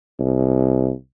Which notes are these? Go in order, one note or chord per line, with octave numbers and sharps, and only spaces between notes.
C2